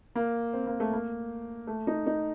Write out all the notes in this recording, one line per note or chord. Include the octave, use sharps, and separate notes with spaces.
A#3
C4
A#3
A3
A#3
A3
D#4
D#4